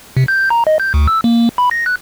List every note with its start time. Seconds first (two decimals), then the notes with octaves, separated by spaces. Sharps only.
0.17 C3
0.28 G6
0.50 A#5
0.67 D#5
0.80 G6
0.94 D2
1.08 E6
1.24 A#3
1.58 B5
1.71 A#6
1.86 F#6